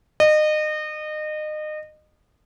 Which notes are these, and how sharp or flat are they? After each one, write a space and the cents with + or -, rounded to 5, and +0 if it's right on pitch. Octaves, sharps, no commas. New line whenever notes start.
D#5 -30